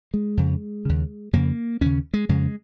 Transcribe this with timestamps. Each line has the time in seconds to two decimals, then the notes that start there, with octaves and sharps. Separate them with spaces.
0.14 G#3
0.37 F2 C#3
0.85 D#2 C#3
1.33 F2 C#3 A#3
1.81 D#2 C#3 C#4
2.14 G#3
2.29 F2 C#3 G#3